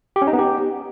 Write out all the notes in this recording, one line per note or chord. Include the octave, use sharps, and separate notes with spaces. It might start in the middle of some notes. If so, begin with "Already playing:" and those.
G4
C#4
D#4
B3
G4